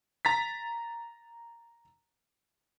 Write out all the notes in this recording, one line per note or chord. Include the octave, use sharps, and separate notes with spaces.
A#5 A6 B6